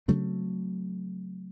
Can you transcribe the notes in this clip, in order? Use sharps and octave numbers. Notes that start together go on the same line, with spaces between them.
C#3 F#3 A3 C4